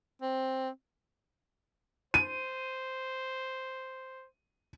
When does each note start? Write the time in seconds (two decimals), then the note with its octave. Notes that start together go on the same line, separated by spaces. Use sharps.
0.22 C4
2.14 C5 D#7